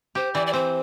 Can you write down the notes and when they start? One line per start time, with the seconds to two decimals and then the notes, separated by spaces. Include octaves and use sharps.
0.15 G4 C5
0.34 E3 D5
0.47 D5
0.53 C4 C5